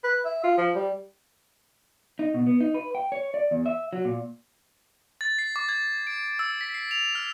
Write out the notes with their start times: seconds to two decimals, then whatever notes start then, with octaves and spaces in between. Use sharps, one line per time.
0.04 B4
0.25 E5
0.43 F4
0.58 F3
0.75 G3
2.19 D#4
2.34 B2
2.47 B3
2.60 D#4
2.74 B4
2.95 G5
3.12 C#5
3.34 D5
3.51 E2
3.66 E5
3.93 F#3
4.05 A#2
5.21 A6
5.39 C7
5.56 D6
5.69 G#6
6.07 D7
6.39 E6
6.61 B6
6.74 C7
6.91 F7
7.15 F6